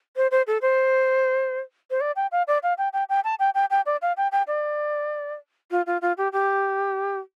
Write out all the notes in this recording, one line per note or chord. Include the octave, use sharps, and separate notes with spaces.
C5
C5
A4
C5
C5
D5
G5
F5
D5
F5
G5
G5
G5
A5
G5
G5
G5
D5
F5
G5
G5
D5
F4
F4
F4
G4
G4